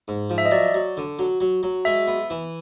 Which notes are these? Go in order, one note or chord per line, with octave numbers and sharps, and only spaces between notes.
G#2
F3
E5
D#5
F#3 D5
F#3
D3
F#3
F#3
F#3
G#3 E5
B3
E3